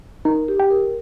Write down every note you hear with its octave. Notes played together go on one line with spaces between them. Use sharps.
D#4 A#4
G4
G5
A#4